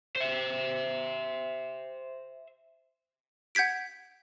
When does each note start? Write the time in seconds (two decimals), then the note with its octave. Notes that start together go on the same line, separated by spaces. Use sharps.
0.16 C5 E5
3.55 F#5 G6 G#6 B6 D7